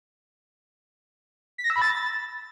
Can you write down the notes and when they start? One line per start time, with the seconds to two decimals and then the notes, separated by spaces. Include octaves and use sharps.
1.58 B6
1.64 A#6
1.70 E6
1.76 B5
1.82 A6